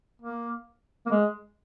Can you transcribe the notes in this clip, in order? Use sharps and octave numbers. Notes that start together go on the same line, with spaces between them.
A#3
A#3
G#3